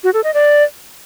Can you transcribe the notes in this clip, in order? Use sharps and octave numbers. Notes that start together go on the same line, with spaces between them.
F#4
A4
D#5
D5